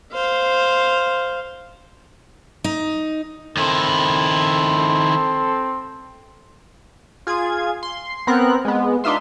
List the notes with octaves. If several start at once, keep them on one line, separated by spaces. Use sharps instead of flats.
C5 F5
D#4
D#3 C4 E4 A4 C6
F4 G#4 G#6
C6
B3 C4 A#4 F#6
G#3 B3
D4 D#4 F4 E5 C6